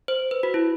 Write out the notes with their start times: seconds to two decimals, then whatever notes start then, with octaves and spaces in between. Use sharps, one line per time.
0.08 C5
0.31 B4
0.43 F#4
0.54 E4